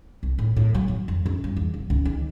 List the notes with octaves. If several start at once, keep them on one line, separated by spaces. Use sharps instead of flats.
C2
A2
A2
F#3
F#3
F2
F#2
G2
E2
E1
C#2
D#3